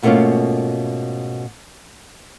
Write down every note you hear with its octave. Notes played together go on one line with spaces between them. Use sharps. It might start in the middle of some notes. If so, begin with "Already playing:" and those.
G#2 B2 A3 A#3 C#4 F4